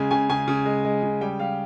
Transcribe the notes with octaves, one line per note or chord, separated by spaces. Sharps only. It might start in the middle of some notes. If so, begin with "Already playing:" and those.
Already playing: C#3 G#3 G#5
C#3 G#5
C#3 G#5
C#3
G#3
G#3
C#3
G3 G5
G3 F5